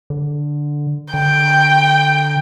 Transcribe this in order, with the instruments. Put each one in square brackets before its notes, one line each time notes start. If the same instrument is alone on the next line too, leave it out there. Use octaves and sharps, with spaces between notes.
[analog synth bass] D3
[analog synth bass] D3 [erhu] G5